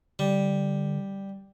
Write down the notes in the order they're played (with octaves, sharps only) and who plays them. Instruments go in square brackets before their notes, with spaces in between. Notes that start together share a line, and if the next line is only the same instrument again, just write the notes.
[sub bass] D3 [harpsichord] G3